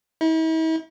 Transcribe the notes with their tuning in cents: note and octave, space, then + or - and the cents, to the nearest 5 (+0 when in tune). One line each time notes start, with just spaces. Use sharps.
E4 -45